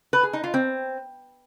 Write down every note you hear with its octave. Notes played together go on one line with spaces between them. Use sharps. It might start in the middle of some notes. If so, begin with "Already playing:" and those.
B4
G#4
D#4
F4
C4